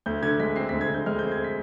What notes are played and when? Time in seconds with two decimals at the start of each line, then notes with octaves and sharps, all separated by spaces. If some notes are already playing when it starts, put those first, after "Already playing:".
0.06 D2 G6
0.23 D3 G#6
0.40 G#3 B6
0.56 C4 C7
0.69 D2 B6
0.81 G#6
0.89 D3 G6
1.06 G#3 F6
1.19 C4 G6
1.32 G#6
1.44 B6